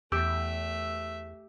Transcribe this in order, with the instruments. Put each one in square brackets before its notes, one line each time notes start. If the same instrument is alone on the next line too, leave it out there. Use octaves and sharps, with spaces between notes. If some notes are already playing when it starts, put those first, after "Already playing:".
[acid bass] E2 [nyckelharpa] A3 E5 [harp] G4 [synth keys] E6